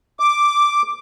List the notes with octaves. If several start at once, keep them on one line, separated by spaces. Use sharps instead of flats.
D6